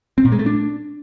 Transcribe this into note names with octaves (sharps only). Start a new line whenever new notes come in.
C4
A#2
G#3
A3
D4